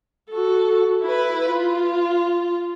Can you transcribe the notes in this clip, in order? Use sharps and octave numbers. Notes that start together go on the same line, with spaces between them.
F#4 A4
E4 B4
F4